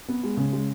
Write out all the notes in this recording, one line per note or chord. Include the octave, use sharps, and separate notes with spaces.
B3
G#3
C#3
G#3